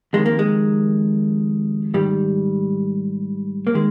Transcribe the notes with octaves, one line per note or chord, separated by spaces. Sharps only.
F2 C3 D#3 G#3
A#3
G#3
G#2 D#3 G3
A#3
D#3 G#3